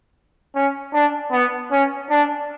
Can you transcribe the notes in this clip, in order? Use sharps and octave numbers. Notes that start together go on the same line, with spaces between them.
C#4
D4
B3
C#4
D4